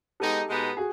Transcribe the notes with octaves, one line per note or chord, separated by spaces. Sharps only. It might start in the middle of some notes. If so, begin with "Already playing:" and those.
G#3 B3 D#4 G4 A4
B2 G#3 B3 D#4
F#4 G#4